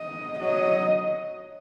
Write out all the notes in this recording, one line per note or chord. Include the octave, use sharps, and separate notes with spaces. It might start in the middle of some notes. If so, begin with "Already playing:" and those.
Already playing: D#5
F#3 D#5